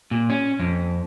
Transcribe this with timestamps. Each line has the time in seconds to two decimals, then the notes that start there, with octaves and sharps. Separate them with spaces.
0.11 A#2
0.30 C#4
0.59 F2